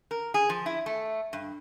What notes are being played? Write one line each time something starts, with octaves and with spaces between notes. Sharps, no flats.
A#4
G#4
F3
E4
A3
G2